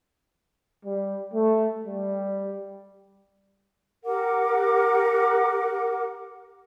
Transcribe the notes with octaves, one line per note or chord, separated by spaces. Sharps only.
G3
A3
G3
G4 A#4 F#5 D6